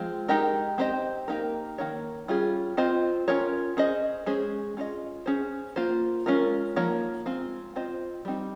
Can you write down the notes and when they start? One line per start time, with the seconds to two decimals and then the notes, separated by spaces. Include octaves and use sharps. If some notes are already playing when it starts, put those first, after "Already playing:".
Already playing: F3 G#3 C4
0.28 G#3 D#4 G4 A#4 D#5
0.78 C4 G4 C5 D#5
1.28 A#3 D#4 G4 A#4
1.78 D#3 A#3 D#4 A#4 C#5
2.28 G3 C#4 F4 G#4
2.77 C4 F4 C5 D#5
3.28 C#4 F4 A#4 C#5
3.77 C#4 G#4 C5 D#5
4.26 G#3 C#4 G#4 C5
4.77 C#4 F4 G#4 C5 D#5
5.26 C#4 G#4 C5
5.76 A#3 F4 C5
6.26 G#3 C#4 F4 A#4
6.76 F3 A#3 D#4 A#4 C#5
7.26 G#3 C4 F4
7.76 C4 F4 C5 D#5
8.25 G3 C4 D#4